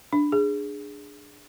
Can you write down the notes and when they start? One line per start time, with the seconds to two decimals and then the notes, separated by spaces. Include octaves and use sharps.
0.13 D4
0.32 G#4